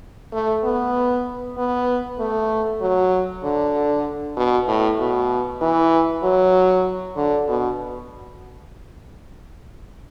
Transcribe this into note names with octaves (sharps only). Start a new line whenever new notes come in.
A3
B3
B3
A3
F#3
D3
B2
A2
B2
E3
F#3
D3
B2